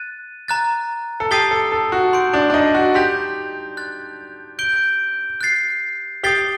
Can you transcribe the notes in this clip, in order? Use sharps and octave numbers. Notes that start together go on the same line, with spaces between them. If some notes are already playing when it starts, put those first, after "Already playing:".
Already playing: F#6 A6 D#7
A#5 F#6 A6
A4
G4 A5 D#6 A6 C7 G7
A4
A4
F#4
C6 G6 D7
D4
D4
D#4
F#4
G4 C6 G6 A#6 F#7
C6 F#6 A6
G6 D7 G7
F#6 A6 C7
G4 D#6 A6 C7 G7